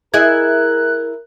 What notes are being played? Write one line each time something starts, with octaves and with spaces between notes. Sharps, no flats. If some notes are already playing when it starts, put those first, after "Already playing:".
E4 G#4 A#4 D#5 F#6 G#6